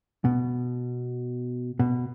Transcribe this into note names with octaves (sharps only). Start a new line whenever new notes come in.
B2
B2